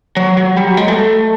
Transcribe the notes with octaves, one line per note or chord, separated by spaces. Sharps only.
F#3
F#3
G3
F#3
G#3
A3